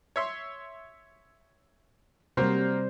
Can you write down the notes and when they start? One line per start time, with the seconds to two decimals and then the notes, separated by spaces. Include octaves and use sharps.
0.16 C#5 E5 C6
2.37 C3 F#3 G3 A#3 A#4 C5